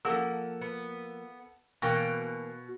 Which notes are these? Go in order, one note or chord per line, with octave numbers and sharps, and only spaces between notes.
F3 A#3 A4 F#5 E6
B3
B2 E3 A#3 F#4 G5 C#6 A#6